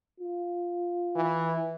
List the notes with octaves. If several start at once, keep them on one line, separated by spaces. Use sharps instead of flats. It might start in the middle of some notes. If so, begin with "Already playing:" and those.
F4
E3